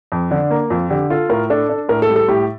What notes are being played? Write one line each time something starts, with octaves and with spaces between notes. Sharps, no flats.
F2
D3 D4
A#3
F2 F4
D3 G4
F4 A4
A2 A#4
D4 A4
D4
A2 A#4
A4
G3
A4
A2 G4